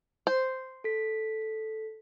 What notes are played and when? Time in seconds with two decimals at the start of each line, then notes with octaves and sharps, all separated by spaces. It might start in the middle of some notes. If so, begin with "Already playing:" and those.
0.27 C5
0.84 A4 B6